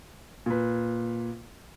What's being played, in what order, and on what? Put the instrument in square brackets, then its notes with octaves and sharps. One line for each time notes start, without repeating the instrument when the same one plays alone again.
[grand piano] A#2 B4